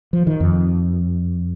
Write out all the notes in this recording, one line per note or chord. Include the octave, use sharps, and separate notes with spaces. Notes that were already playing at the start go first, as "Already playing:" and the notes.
F3
D#3
F2